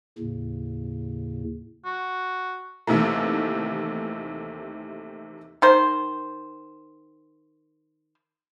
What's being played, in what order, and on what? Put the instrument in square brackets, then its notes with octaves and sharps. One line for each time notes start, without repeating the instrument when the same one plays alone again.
[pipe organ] D#2 A2 C#3
[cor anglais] F#4
[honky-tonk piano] D#2 C3 D#3 E3 A3
[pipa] D#3 C5